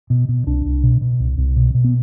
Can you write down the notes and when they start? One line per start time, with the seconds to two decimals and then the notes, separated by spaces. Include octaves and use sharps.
0.10 B2
0.29 B2
0.46 C2 D4
0.65 C2
0.84 B2
1.01 B2
1.20 C2
1.38 C2
1.56 B2
1.75 B2
1.84 B3